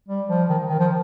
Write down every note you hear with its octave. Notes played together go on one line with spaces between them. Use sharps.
G3
F3
D#3
D#3
F3